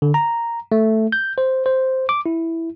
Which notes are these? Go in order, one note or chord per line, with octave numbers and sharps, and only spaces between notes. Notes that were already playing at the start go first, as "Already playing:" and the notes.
D3
A#5
A3
G6
C5
C5
D6
E4